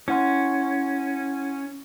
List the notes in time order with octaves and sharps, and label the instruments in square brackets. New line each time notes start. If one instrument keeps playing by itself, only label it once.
[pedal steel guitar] C#4 [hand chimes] E4 F#5 C6